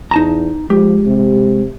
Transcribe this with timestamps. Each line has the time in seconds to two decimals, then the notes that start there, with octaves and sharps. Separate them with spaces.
0.11 E2 D#4 A5 A#5
0.70 F3 G#3 G4
1.06 C3